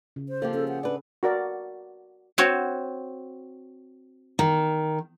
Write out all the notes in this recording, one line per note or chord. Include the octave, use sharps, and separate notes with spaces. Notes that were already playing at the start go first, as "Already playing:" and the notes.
C#3
C5
F3 A#3 G4 A4
C#4 G#4 A4
F#5
D4 B4
F#4 A#4 D5
C4 F#4 C#5
D#3